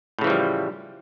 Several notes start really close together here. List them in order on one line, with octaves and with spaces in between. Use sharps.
A2 C#3 E3 F3 G3